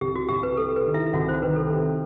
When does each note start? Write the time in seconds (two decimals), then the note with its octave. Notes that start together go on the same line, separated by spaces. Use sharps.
0.01 C2 G4
0.16 F#4
0.28 C2 G4
0.43 B4
0.57 C3 A4
0.76 B4
0.86 D#3
0.94 E4 E5
1.13 C2 F#4 F#5
1.28 C5
1.42 D#3 B4
1.56 A4
1.70 C3